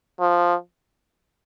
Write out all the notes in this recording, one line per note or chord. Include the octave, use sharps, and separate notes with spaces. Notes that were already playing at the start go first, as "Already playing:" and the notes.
F3